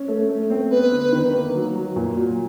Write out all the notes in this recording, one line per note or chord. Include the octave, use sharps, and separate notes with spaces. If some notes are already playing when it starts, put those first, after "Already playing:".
Already playing: C#4
A3
A3
C4
B3 B4
D3
D#3
A#3
F#3
F#3
A#2
F#3